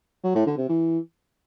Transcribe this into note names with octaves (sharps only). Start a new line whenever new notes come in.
F#3
A2
D3
C3
E3